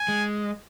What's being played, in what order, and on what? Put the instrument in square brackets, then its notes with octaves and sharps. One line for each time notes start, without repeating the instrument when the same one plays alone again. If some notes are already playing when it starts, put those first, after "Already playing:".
Already playing: [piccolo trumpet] G#5
[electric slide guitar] G#3